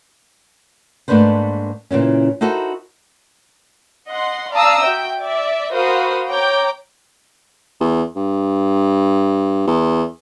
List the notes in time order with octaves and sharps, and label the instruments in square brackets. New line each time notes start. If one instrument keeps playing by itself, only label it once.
[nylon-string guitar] G#2 A3 A#3 D4 B4 C5
A#2 C#3 E3 C#4
D#4 E4 F#4 A4 A#4 C5
[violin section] D#5 F#5 C6
D5 F5 A5 A#5 D#6 E6
F#4 E5 G5
D5 E5
F#4 A#4 C5 F5 B5 D#6
C#5 G5 A#5 D6 G6
[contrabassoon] E2
G2
E2